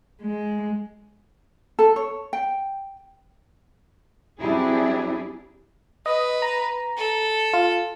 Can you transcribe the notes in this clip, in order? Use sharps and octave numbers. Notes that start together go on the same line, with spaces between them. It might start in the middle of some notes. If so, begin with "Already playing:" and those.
G#3
A4
C#5
G5
F#3 C4 D4 E4 G4 G#4
B4 D#5
A#5
A4
F4